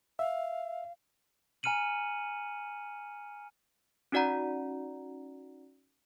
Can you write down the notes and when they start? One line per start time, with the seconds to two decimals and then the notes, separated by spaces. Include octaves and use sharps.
0.19 E5 F5
1.63 G#5 A#5 F6 C#7 D#7 F#7
4.12 C#4 D#4 F#4 D5 F#5 A#5